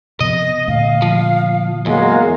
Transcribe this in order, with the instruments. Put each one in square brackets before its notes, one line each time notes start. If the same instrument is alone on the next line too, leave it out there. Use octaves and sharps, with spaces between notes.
[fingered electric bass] C3 F3 B3 [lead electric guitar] D#5 [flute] A#6
[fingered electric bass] A#2 D3 A3 [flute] F5
[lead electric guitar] F3
[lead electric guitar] E2 [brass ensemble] F#3 G#3 A#3 [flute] F5